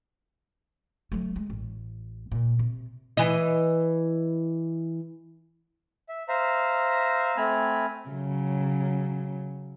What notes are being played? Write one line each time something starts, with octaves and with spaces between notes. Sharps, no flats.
F#3 A3
G#3
A1
A#2
C3
E3 D#5
E5
C5 E5 F5 A#5
A3 C4 G#5 B5 F6
C#3 F#3